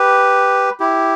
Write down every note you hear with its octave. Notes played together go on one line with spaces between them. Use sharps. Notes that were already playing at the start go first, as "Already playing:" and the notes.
Already playing: G4 B4
E4 G4